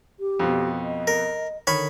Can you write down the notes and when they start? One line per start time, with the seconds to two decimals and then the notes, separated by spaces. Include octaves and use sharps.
0.19 G4
0.39 F2 B2
0.82 D#5
1.07 A#4
1.67 D3 D#3 C#5 B5